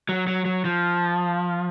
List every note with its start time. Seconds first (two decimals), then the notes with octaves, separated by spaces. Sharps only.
0.09 F#3
0.27 F#3
0.45 F#3
0.65 F3